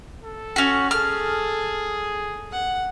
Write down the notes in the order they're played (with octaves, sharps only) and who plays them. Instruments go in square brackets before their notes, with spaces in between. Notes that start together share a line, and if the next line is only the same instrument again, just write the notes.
[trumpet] A4
[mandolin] C#4 F#4
[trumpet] G#4 [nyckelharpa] A4 [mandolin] F6
[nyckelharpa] F#5